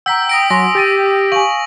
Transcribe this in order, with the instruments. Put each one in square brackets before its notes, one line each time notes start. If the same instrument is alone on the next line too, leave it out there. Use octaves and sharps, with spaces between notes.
[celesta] F#5 A#5 [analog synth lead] G5 [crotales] E6 B6
[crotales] D#6 A#6 D7
[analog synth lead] F#3 [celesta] G#5 C6 [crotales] A#6
[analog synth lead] G4 [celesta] G5 A6 D#7
[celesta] F5 G#5 [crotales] C#6 F#7